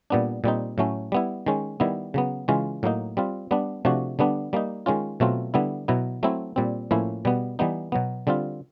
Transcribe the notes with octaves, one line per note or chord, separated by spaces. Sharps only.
A#2 G3 B3 D4
A#2 G3 C4 D#4
A2 F#3 A3 C#4
G3 B3 E4
D#3 G#3 C#4
D#3 G3 B3 E4
C#3 F#3 B3
C#3 E3 G#3 C#4 F4
A2 F#3 A#3 D#4
G3 C4 F4
G3 B3 D4
C3 F3 A3 D4 F#4
D3 G3 B3 D4
G3 A#3 D#4
D#3 G#3 C#4 F4
B2 F#3 A3 C4 F4
D3 G3 B3 E4
B2 F#3 B3 E4
F#3 A3 C4 E4
A#2 G3 C4
A2 F3 A#3 C#4 E4
B2 G3 B3
E3 G3 B3 D#4
B2 F#3 B3
D3 G3 C4 F4